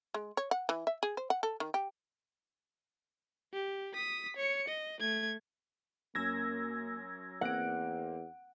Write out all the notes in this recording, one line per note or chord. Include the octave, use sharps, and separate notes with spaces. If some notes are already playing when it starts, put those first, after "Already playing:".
G#3
C#5
F#5
E3
E5
G#4
C5
F#5
A4
D#3
G4
G4
D#6 B6
C#5 C#7
D#5
A3 G#6
F#2 A#3 C#4 E6 G#6 A#6
E2 A#3 C4 F#5 D7